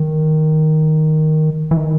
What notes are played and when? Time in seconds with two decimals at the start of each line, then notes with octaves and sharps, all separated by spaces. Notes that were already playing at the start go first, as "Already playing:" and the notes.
Already playing: D#3
1.71 E3
1.77 D#3